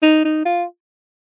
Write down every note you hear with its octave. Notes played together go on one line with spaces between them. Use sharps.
D#4
D#4
F4